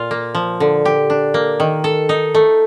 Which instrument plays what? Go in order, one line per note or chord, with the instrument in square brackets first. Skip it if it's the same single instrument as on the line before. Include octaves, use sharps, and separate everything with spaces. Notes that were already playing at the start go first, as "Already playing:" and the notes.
Already playing: [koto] A#2 F4
A#3
F3
D3
G4
D4
A#3
D#3
A4
D#4
A3